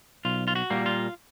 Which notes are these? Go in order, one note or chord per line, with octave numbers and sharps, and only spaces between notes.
B1 F4
F4
F#4
A#2 G3 A#3
F4